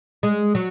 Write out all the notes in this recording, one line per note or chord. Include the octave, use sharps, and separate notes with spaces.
G#3
F#3